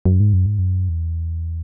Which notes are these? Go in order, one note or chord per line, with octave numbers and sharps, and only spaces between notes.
F#2
G#2
F#2
G#2
F#2
E2